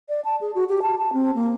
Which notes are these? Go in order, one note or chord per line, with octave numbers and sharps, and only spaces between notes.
D5
A5
G#4
F#4
G4
A5
A5
C4
A#3